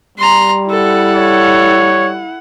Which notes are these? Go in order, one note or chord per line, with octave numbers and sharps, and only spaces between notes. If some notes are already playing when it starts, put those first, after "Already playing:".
G3 A#5 C6
E4 A4 F#5
C#5